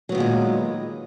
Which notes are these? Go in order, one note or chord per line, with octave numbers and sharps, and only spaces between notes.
A#2 D#3 F#3 G#3 B3